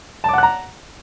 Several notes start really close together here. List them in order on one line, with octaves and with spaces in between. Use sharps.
A5 D6 F#5 F#6 A#5